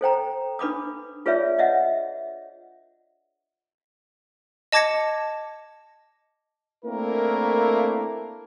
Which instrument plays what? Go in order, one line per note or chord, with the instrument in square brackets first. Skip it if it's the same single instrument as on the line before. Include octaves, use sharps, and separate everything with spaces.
[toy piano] A4 C5 G5 A#5
D4 B4 B5 D6 D#6
F4 G#4 B4 C#5 D5 E5
D#5 E5 F#5
[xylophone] D#5 A5 D6 G#6 A#6 C#7
[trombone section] A3 A#3 C4 D4 E4 A#4